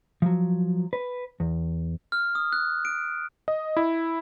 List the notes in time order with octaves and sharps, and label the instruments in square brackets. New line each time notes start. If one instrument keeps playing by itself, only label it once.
[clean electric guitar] F3 F#3
B4
E2
[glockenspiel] F6
D#6
F#6
D7
[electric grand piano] D#5
E4